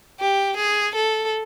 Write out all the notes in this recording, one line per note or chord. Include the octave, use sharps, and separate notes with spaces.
G4
G#4
A4